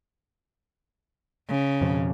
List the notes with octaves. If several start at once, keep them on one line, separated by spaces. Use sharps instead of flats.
C#3
F2 B2 F3